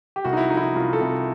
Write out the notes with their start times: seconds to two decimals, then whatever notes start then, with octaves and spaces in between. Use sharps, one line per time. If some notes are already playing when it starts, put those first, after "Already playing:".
0.16 G4
0.24 C2 F#4
0.33 D#4
0.37 E4
0.50 F3 D#4
0.57 E4
0.63 D#4
0.75 C2 F4
0.93 A4
1.01 C3